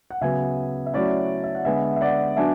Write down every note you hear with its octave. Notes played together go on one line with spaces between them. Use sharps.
F#5
C#3 F#3 B3 E5 G#5
E5
F#3 A3 C#4 E4 D5 F#5
E5
F#5
D3 G#3 B3 E5 G#5
E5
D5 F#5
F#3 B3 D4 E5 G#5